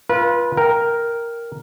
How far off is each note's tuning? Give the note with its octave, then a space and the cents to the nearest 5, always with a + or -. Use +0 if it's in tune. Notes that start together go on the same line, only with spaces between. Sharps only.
F4 -10 B4 -30
A#4 +0 G5 +0